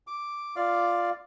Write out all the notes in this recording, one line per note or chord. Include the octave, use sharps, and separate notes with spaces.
D6
F4 D5 F5